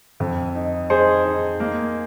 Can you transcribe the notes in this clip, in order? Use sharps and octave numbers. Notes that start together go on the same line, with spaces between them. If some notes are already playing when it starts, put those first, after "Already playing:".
F2
D#4
D#4 G#4 C5
D#4
A#3